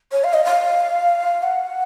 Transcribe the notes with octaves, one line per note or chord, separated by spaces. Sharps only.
C#5
F5
D#5
F5
F#5